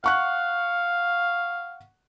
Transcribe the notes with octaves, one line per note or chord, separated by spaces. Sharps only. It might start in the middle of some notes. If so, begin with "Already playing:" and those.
F5 F#5 C#6 F#6